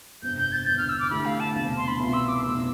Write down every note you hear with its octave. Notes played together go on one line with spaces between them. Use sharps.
G1 F2 C3 G6
G6
A6
E1 E2 D3 G6
F6
E6
D6
D2 D3 A3 E4 G4 B5
F5
A5
E1 E2 C3 F3
C6
B5
C2 B2 B3 F4 C6
E6
D6
F1 E2 B2 E6